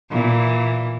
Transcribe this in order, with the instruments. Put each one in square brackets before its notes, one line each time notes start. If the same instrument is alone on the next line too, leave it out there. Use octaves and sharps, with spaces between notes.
[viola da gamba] A#2 E3